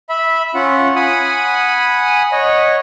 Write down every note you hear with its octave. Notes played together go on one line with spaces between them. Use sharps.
E5 B5
C#4 F4 F#5
F#5 G#5 B5 D#6
C#5 D#5 F#5